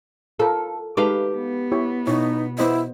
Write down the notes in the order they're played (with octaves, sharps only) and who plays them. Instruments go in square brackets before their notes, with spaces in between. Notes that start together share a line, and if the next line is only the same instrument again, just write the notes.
[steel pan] F4 A#4 B5 [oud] A4
[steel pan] G#3 D#4 A4 [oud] G4 B4 F5
[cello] B3
[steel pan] E4 G4 C#5
[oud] B2 [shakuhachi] D#4 [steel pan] E4 C#5
[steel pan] B3 C5 D#5 [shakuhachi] E4